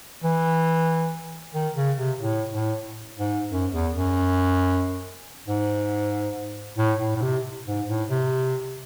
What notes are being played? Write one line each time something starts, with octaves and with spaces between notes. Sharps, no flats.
E3
D#3
C#3
C3
A2
A2
G#2
F#2
E2
F#2
G#2
A2
A2
A2
C3
G#2
A2
C3